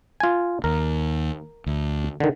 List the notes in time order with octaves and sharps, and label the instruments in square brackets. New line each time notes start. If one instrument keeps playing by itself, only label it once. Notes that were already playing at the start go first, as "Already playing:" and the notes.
[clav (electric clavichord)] F4 G#5
[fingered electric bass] D#2 [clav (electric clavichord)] A#4
[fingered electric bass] D2
[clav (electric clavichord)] D3 D#3